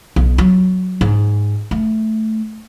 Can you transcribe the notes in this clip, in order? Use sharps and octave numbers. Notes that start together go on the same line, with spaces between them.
B1
F#3
G#2
A3